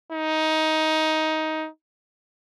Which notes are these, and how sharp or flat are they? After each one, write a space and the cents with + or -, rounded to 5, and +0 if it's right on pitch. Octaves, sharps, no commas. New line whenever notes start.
D#4 +15